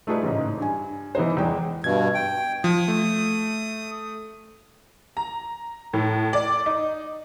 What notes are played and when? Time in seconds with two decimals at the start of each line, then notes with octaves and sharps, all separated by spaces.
0.07 A3 D#4 F4 G#4 B4 D5
0.23 A1 G#2 C#3 D#5
0.58 G2 G#5
1.15 E3 B3 D#4 C5
1.37 E2 G#3 G5
1.84 G2 B2 G#6
2.15 G5
2.64 F3 D#6
2.88 A3
5.17 A#5
5.93 A2
6.33 D5
6.66 D#4